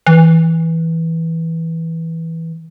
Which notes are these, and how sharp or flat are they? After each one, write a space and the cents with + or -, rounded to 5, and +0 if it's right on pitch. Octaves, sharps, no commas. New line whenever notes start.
E3 -10